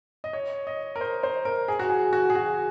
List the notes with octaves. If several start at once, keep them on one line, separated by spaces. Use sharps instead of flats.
D#5
C#5
D#5
A#4
C5
C5
A#4
G#4
F#4
G#4
F#4
G#4
F#4